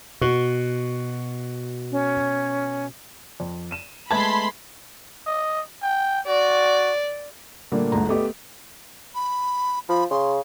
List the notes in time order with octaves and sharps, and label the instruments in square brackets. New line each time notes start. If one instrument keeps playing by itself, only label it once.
[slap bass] B2 [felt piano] F#4
[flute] C#4
[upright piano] F2
D#7 E7
[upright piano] G#3 A3 B3 [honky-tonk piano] A5 G#6 [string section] B5 C6
[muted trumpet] D#5
G5
[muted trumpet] F#4 [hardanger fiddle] D5
[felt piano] A#2 D3 G3 A3 A#3
G1 D2 G#2 D3 A#5
A3 B3 G4 D#5
[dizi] B5
[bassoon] F3 [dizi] B5
[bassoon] C#3 [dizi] C6